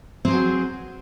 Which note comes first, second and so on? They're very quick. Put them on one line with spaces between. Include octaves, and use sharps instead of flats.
C4 G#4 F#3 F#4